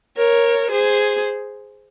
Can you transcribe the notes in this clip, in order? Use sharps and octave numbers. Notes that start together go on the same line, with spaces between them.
A#4 C#5
G#4 C5